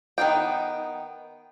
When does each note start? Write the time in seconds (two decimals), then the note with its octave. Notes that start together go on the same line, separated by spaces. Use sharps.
0.18 D#3 B3 F4 G5